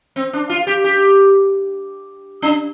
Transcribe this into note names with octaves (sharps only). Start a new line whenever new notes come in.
C4
D4
F4
G4
G4
D4